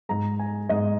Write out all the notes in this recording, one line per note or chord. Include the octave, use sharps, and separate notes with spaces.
G#2 G#3 A#5
G#5
G#2 G#3 D#5